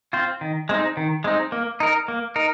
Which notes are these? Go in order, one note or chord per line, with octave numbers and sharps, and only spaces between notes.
C4 F4 C5
D#3
G#3 C4 D#4
D#3
G#3 C4 D#4
A#3
D#4 A#4
A#3
D#4 A#4